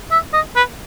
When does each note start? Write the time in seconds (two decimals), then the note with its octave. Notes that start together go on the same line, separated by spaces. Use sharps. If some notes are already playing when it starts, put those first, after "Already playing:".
0.11 E5
0.33 D#5
0.56 B4